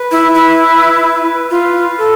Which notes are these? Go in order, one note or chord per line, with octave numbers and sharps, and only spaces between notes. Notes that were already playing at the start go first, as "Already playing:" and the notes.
Already playing: B4
E4
E4
F4 B4
A4